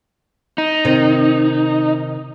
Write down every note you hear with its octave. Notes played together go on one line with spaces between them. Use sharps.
D#4
C3 D#3